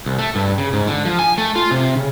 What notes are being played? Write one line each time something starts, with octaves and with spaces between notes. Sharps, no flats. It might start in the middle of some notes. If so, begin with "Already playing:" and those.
C2
A3
G2
C#3
G#2
D3
F3
G#5
A3
F4
C3
C#3